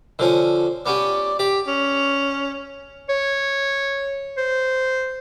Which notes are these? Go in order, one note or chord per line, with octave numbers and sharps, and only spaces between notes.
D3 F3 C#4
B3 C#4 G4 D5
G4 D5
C#4
C#5
C5